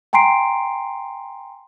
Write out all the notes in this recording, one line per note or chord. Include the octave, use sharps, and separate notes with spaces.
G5 G#5 A#5 C6 C7 D7